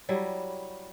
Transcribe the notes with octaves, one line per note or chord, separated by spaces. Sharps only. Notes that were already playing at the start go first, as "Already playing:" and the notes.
F#3 G3 E4